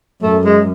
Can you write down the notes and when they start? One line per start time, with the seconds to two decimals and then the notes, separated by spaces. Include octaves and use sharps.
0.22 F#2 A3
0.44 G#3